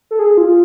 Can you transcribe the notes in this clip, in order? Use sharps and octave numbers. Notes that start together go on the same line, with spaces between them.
A4
G#4
F4